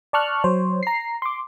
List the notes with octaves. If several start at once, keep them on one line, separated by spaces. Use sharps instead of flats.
D5 A5 C#6 F6 F#6
F#3 C5 C#5
A#5 C7
C6 D6